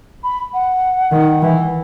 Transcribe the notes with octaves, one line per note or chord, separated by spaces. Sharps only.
B5
F#5
D#3
E3